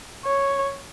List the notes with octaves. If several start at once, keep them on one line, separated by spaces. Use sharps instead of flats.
C#5